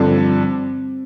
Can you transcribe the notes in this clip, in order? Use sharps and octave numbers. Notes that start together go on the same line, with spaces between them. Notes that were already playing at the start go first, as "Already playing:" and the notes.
Already playing: G2 D3 F3 C4